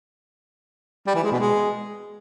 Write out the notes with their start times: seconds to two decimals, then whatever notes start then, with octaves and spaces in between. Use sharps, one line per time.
1.07 G3
1.15 E3
1.24 G#3
1.32 B2
1.40 G#3